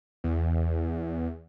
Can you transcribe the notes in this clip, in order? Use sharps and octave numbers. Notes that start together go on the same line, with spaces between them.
E2